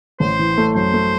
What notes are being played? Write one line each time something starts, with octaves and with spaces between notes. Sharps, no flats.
A1 C5
E3
A3
F#2 C5
A3